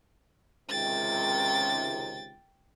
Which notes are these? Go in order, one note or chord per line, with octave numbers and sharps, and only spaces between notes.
C#2 C3 D#3 G5 A6